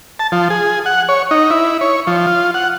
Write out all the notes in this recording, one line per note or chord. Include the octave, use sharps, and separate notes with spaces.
A5
F3
G#4
F#5
C#5
D#4
E4
C#5
F3
F4
F#5